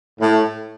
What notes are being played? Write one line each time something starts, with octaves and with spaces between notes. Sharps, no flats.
A2